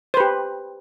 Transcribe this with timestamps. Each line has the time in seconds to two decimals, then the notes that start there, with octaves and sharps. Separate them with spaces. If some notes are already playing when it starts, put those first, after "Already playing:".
0.14 C5
0.17 B4
0.20 G4